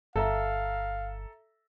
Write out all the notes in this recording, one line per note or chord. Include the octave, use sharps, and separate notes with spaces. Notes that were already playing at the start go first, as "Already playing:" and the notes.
G1 A4 E5 F5 A#5